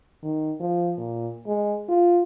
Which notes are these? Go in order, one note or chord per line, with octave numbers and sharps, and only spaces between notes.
D#3
F3
A#2
G#3
F4